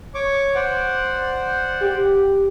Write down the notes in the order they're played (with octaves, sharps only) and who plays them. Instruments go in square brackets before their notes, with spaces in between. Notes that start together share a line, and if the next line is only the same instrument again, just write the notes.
[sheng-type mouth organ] C#5 C#6 D6
C5 D5 F#5
[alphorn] G4